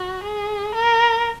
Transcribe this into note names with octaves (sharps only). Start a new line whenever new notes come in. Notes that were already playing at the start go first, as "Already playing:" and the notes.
Already playing: F#4
G#4
A#4